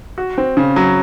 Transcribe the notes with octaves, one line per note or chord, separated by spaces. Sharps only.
F#4
C4
C#3
F#3